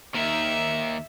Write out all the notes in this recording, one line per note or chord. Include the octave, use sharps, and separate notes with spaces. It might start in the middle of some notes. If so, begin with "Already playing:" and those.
D#2 D#3 E5